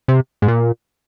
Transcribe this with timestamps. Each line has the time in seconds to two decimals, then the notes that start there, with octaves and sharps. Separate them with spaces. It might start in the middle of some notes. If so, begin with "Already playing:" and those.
0.08 C3
0.42 G#2
0.48 A#2